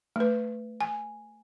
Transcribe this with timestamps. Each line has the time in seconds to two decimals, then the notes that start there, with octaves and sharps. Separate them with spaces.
0.16 A3 B4
0.81 G#5